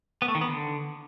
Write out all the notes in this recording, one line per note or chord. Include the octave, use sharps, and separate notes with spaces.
B3
A3
D#3
B3
D3